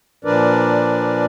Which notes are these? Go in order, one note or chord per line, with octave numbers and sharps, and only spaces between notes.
A#2 F3 D4 A#4 B4 D5